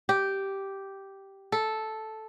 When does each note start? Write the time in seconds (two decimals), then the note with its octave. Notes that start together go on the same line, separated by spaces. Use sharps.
0.09 G4
1.52 A4